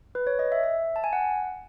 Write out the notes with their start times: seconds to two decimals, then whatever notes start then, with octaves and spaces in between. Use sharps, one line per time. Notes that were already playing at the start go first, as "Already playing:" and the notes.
0.15 B4
0.27 C#5
0.39 D#5
0.52 E5
0.64 E5
0.96 A5
1.04 G#5
1.13 F#5